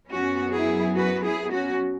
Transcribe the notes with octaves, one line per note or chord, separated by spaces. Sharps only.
F#2 F#3 B3 C#4 F#4
E4 G#4
F#4 B4
E4 G#4
C#4 F#4